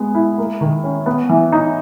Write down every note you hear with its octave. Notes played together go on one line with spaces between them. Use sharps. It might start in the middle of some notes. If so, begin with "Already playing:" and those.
Already playing: G#3 B3
E4
A#3
D#3
C#4
B3
E3
D#4